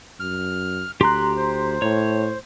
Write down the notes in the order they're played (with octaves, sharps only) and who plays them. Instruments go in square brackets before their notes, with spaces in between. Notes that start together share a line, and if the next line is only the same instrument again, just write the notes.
[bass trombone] F#2 [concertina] F6
[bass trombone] D2 [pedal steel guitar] G4 F#6 [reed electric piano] A#5 C6
[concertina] C5
[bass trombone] A2 [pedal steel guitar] C#5